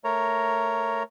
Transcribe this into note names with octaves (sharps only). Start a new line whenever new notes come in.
A3 A#4 C#5 A#5